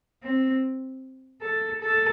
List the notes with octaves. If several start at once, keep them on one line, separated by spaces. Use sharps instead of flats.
C4
A4
A4